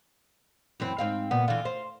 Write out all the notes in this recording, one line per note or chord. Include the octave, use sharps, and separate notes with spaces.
F#2 E3 C4
G#2 C4 F5
A#2 B3
D3 E3 F4
C5